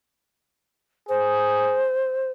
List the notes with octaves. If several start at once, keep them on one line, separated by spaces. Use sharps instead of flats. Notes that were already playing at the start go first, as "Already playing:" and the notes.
G#4 C5